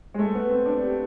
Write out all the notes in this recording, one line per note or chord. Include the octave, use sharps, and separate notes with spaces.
G#3
A3
B3
C4
D4
G4